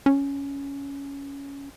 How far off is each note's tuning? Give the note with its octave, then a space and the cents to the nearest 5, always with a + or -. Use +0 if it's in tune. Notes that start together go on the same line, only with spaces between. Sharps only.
C#4 +10